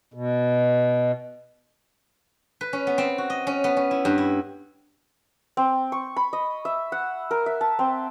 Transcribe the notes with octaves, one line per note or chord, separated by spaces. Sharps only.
B2
B4
C#4
B3
C4
F#4
D#5
C#4
B3
C#4
E4
G2
E4
C4
C#6
B5
D#5
E5
F#5
A#4
E5
A5
C4